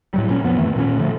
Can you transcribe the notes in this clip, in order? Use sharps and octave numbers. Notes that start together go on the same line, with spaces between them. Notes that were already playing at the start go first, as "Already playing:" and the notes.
A2 F#3 G3
A#2 C#4
F1 F2 F3 B3
F2 D#3 E3 A3
A#2 C4 C#4
D3 F3 A3